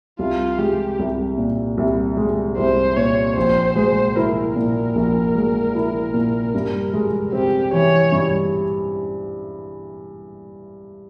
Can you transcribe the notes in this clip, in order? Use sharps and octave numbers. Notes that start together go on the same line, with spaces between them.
C2 F4
G#3 G4
C2
A#2
C2
G#3
C2 C5
A#2 C#5
A#1 C5
G#3 C5
E4 A#4
A#2
A#1
G#3
E4
A#2
G2
G#3
C4 G4
E3 C#5
G2